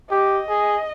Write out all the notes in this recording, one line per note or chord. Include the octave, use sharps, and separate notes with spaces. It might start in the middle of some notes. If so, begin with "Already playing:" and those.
G4 D#5
G#4